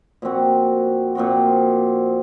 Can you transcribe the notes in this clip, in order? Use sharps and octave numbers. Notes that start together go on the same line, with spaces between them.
A#2 F3 C4 F#4
A#2 F3 C4 F#4